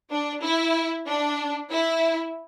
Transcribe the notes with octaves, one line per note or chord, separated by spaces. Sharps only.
D4
E4
D4
E4